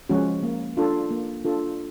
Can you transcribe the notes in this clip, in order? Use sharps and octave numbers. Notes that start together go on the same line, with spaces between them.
F3 G#3 C#4 F#4
A#3
D4 F4 A4
A#3
D4 F4 A4